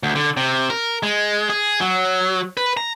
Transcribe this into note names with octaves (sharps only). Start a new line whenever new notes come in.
D2
D3
C3
A#4
G#3
G#4
F#3
B4
A#5